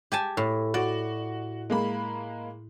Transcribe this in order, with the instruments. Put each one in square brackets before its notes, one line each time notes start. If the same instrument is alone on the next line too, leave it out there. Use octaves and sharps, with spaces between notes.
[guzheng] G4 G#5 A5
A2
[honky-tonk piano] F#4 [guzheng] D5
[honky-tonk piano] G#3 A#3 B5